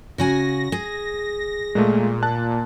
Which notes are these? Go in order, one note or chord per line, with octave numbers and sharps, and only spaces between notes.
C#3 F#4 G#5 A#6
G#4
A#2 G#3 A3
A5 F#6